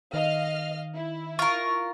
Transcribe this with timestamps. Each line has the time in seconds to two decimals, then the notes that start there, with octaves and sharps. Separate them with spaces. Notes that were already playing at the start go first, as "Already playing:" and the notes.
0.14 D#3 D#5 F5 F6
0.94 E4
1.39 F4 A#4 C#6